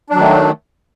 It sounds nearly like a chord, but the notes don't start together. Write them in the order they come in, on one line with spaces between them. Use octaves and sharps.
D4 F#3 D#3 A3